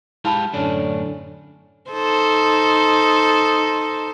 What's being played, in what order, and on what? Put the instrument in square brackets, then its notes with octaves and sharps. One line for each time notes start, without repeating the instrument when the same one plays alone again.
[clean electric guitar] G#3 G4 F5 [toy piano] E4 A5 B5
[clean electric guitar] F#2 A2 D4 [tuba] D3 [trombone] C#4
[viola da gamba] D#4 A4 C5